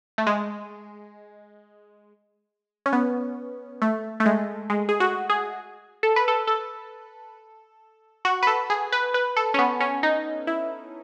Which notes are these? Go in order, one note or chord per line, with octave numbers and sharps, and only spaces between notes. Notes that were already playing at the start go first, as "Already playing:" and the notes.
A3
G#3
C#4
B3
A3
A3
G#3
G#3
G#4
F#4
G#4
A4
B4
A4
A4
F#4
B4
A4
G#4
B4
B4
A4
C#4
B3
C#4
D#4
E4